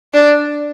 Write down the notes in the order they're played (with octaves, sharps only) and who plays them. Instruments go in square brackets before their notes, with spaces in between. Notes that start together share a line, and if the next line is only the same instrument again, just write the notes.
[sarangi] D4